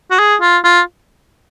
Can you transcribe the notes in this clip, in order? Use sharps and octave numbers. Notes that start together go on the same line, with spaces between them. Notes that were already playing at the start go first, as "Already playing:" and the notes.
F#4
G#4
F4
F4